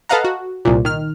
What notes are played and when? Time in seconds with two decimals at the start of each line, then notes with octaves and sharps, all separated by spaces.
0.09 A4 B4 D#5 F5 F#5 A#5
0.25 F#4
0.65 C2 A#2
0.85 D#3 F6